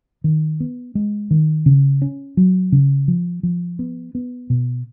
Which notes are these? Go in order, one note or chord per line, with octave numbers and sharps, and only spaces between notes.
D#3
B3
G#3
D#3
C#3
C#4
F#3
C#3
F3
F3
B3
B3
B2